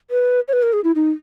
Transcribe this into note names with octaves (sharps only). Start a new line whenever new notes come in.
B4
C#5
B4
A#4
G#4
E4
D#4